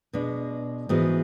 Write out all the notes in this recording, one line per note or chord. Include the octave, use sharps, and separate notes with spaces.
B2 G#3 D4
G#2 E3 G#3 B3 F#4